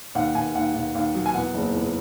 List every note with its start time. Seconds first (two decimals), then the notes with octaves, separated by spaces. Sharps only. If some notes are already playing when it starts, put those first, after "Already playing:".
0.15 D#2 F#5
0.35 D#2 G#5
0.55 D#2 F#5
0.75 D#2
0.95 D#2
1.15 F#3
1.26 G#5
1.34 E2 F#5
1.54 F#1
1.74 E2